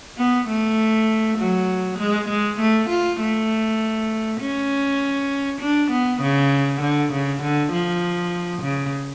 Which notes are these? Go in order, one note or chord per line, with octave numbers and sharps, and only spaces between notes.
B3
A3
F#3
G#3
G#3
A3
F4
A3
C#4
D4
B3
C#3
D3
C#3
D3
F3
C#3